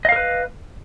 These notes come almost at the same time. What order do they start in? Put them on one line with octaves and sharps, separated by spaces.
D#5 F5 A#4 B4